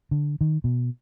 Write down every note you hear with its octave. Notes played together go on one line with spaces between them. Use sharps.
D3
D#3
B2